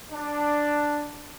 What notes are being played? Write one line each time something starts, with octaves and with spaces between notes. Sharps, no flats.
D4